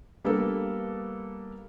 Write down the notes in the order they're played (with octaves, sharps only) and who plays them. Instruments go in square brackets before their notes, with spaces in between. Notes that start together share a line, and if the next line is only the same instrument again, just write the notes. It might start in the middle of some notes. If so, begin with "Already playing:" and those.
[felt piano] G3 A#3 B3 D4 A4